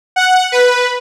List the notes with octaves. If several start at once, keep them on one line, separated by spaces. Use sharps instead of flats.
F#5
B4